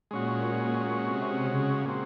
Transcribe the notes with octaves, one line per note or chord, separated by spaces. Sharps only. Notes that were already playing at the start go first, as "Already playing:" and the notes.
A#2 G#3 C#4 F#4
C3
C#3
A#2 G#3 C4 F#4